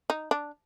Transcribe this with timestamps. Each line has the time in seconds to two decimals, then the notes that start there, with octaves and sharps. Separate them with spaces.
0.10 D#4
0.31 D4